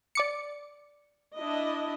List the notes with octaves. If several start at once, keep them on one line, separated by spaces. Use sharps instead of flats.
D5 D6 C#7
D4 E4 D#5